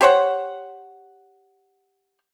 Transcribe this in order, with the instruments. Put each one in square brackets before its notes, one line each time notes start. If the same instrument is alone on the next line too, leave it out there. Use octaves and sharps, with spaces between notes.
[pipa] G4 C5 C#5 F#5